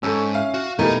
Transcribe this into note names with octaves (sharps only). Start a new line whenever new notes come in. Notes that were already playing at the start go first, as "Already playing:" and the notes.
G#2 C#4 A4 C#6 E6
E5 F5
F#4
B2 E3 G3 A3 D#4 A#4 D#5